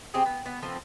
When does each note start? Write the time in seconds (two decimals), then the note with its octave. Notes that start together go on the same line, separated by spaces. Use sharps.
0.14 C4 G4 G#4
0.26 B3
0.46 B3
0.63 F3 A3 B3 C4